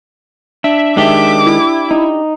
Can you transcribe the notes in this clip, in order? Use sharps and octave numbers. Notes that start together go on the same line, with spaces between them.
D4 E5
D#3 G#3 D4 G4 D6
E4
D#4